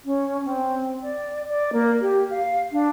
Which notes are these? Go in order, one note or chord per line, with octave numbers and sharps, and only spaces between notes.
C#4
C4
D5
D5
A#3
G4
F5
D4